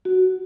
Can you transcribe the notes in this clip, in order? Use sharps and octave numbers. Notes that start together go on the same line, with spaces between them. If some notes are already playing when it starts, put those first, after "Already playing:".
F#4